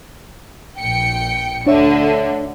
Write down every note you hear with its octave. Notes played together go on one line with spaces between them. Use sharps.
A#1 G5 C#7
D2 D3 D4 C#5 E5